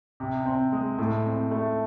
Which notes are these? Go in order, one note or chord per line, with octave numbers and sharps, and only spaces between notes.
C3
C4
G#3
A2
C4
A3